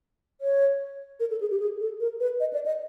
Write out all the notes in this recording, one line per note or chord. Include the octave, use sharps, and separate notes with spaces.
C#5
A#4
A4
G#4
G4
G#4
A4
A#4
B4
D#5
D5
D#5